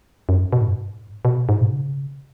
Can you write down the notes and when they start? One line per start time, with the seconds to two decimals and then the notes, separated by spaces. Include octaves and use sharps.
0.29 F#2
0.52 B2
0.61 G#2
0.68 F#2
0.76 G#2
1.25 B2
1.49 G#2
1.61 B2
1.73 C#3